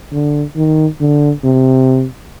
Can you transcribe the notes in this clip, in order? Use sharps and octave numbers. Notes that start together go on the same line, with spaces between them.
D3
D#3
D3
C3